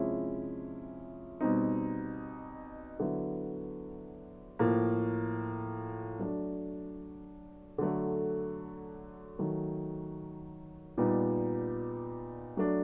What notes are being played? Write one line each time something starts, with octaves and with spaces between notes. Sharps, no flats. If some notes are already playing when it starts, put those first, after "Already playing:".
Already playing: C3 F3 G#3 C#4 E4
B2 G3 C4 D#4
D3 F#3 B3 E4
A2 F3 A#3
F#3 A3 D4
D3 F#3 A3
D#3 F#3 A3
A#2 G3 B3 D#4
F#3 A3 D4